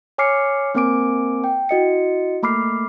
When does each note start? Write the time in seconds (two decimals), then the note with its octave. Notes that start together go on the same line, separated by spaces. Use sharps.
0.18 C#5 G#5 D6 F6 C7 C#7
0.75 A#3 C4 A#4 G#5 D6 D7
1.44 G5
1.69 E4 F#4 D#5 C#7
2.43 A3 A#3 B5 D6 F6 C7